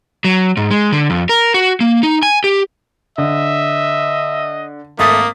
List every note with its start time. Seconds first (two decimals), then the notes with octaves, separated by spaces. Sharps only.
0.24 F#3
0.57 G#2
0.71 G#3
0.92 D3
1.10 F2
1.29 A#4
1.54 F#4
1.81 A#3
2.03 D#4
2.23 G#5
2.44 G4
3.18 D3 D#5 E5
4.99 G#1 A3 A#3 D#6 A6 B6